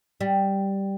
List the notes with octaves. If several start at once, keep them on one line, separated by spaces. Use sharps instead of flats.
G3